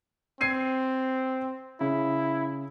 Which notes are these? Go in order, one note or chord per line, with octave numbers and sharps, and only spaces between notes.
C4 G#6 C7 D#7
C#3 E4